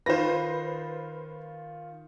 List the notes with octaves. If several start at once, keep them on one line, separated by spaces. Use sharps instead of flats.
D#3 F4 B4 C5 A#6